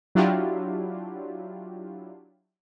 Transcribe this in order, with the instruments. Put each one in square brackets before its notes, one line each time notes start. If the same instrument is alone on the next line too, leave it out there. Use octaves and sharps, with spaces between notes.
[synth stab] F#3 D4 E4 F4 G4